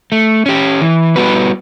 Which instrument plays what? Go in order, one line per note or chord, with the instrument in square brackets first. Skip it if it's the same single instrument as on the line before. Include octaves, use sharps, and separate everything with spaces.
[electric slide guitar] A3
C#4 G4
E3
G3 B3 F#4 B4